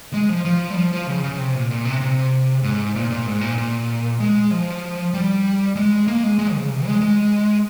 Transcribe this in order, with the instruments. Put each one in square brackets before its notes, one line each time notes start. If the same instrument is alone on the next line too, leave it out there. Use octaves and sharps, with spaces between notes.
[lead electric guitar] G#3
F3
F3
G3
F3
F3
C#3
C#3
C3
A#2
A#2
C3
C3
G#2
A#2
A#2
G#2
A#2
A#2
G#3
F3
G3
G#3
A#3
G#3
G#3
C#3
C3
G#3
G#3